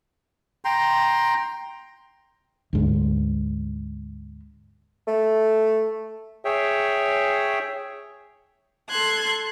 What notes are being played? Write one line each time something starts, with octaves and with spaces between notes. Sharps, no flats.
G5 A#5 C6
D2 G#2
A3
G#4 C#5 E5 G5
A4 C6 F#6 G#6